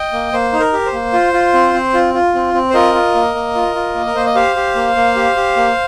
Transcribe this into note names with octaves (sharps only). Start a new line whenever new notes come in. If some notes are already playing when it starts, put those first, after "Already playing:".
Already playing: D#5 G5
A#3
A#3 C5
D#4
A#4
G4
C5
A#3
F4
F4
C4
C4
F4
F4
C4
C4
C5
F4 A#4 D#5
F4
A#3
A#3
F4
F4
A#3
A#4
A#3 C5
D#5
G4 C5 F5
G4
A#3
A#3
G4
G4
A#3